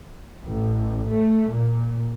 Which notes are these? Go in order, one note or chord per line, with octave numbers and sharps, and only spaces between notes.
A1
A3
A#2